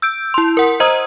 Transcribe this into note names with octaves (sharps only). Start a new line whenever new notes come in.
E6 G6 D7
E4 C6
A#4 F#5
C5 D#5 A#5 D#6 E6